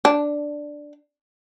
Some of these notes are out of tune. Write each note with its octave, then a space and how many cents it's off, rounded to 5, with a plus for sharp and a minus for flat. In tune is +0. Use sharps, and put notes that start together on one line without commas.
D4 +0